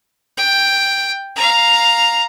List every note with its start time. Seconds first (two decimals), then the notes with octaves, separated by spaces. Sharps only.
0.38 G5
1.36 F5 A#5